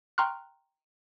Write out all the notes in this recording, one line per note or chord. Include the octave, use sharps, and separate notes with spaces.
G5 A#5 C6 C#6 F6 F#6